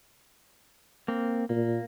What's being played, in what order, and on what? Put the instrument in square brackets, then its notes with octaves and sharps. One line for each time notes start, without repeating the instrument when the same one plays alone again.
[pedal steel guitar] A#3 C4
[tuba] A#2 [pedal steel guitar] A#3